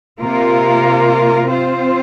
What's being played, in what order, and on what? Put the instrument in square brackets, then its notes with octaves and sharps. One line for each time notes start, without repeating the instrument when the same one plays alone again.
[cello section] C3 A#3 F4 A#4
C4 F4 C5